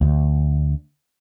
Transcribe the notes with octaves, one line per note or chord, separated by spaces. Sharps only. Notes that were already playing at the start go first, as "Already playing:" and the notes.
D2